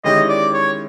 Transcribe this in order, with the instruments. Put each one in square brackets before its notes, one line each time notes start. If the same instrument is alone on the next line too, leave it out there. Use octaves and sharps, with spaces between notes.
[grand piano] D#3 G#3 C#4 E4 G4 [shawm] D#5
[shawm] D5
C#5